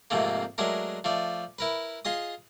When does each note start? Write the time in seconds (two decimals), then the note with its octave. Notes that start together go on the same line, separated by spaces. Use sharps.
0.10 F2 G#2 C3 A3 A#3
0.58 F#3 G#3 A3 D4 A#4
1.04 F3 A3 D5
1.59 E4 A#4 B4
2.05 F4 G#4 D#5 D#6